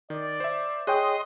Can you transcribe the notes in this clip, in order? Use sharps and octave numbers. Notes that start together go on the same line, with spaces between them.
D#3 D5
C5 E5
G#4 C#5 D#5 G5 C6 D#6 F#6